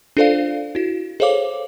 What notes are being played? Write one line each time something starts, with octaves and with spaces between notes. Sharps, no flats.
D4 F4 A4 C5 D5 F5
E4 F#4
G#4 A4 C5 C#5 F5 D6